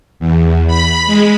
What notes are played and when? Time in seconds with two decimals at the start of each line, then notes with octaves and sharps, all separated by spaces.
0.20 E2
0.67 B5
1.06 G#3